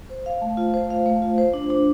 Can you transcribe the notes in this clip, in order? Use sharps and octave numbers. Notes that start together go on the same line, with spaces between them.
C5
F5
A3
F4
C5
F5
A3
F4
C5
D4
D4